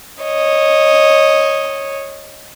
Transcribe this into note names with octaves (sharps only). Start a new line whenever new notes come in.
C#5 D#5